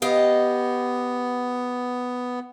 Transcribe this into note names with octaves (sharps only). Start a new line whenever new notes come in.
B3 G4 D#5 F5